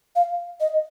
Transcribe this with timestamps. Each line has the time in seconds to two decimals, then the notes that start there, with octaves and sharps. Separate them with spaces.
0.16 F5
0.60 D#5